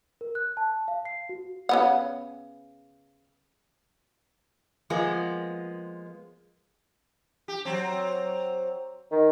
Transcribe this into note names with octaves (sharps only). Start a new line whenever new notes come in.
A#4
F#6
A5
F5
C7
F#4
C#3 B3 F#5
F3 G#3 A#3 B3
G4
F#3 C4
D#3